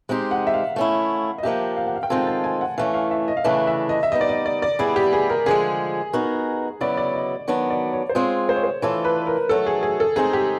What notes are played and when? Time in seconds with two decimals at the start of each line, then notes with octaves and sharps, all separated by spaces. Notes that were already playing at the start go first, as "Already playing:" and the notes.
0.09 G#3 C4 D#4 G4
0.31 F#5
0.47 E5
0.54 F5
0.76 A3 C#4 E4
1.38 D#5
1.43 F3 A#3 D4 G4 E5
1.77 F5
1.86 F#5
1.96 F5
2.03 G5
2.10 D#3 G#3 C4 F4 A4 G#5
2.27 A5
2.44 G#5
2.61 F#5
2.78 E3 A3 C#4 F5
2.94 F5
3.11 E5
3.28 D#5
3.37 F5
3.44 C#3 E3 A3 D4 E5
3.67 E5
3.89 D#5
4.03 E5
4.12 G3 B3 D#4 D#5
4.21 D5
4.29 D#5
4.46 D5
4.62 D5
4.79 G3 B3 E4 G#4
4.96 G4
5.13 G#4
5.30 A#4
5.46 D3 F3 G#3 G#4
6.13 B3 D#4 F#4 A#4
6.81 C#3 F#3 B3 E4 D5
6.97 D5
7.14 D#5
7.48 D#3 F#3 B3 D4
7.70 D5
7.93 C#5
8.09 C5
8.15 G#3 C4 F4 G#4 C#5
8.49 C5
8.56 C#5
8.64 C5
8.82 E3 A3 D4 F4 A4 C#5
9.05 B4
9.27 A#4
9.49 D#3 F#3 A3 A4
9.66 G#4
9.83 G#4
10.00 A4
10.16 G#3 C4 D#4 G#4
10.33 G4